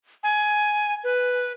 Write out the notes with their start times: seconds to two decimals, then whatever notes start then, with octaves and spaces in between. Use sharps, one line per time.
0.23 G#5
1.04 B4